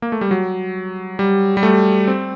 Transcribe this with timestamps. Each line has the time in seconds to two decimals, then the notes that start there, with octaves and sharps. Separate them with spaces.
0.02 A#3
0.12 A3
0.21 G3
0.31 F#3
1.19 G3
1.57 G3
1.63 A3
2.08 C4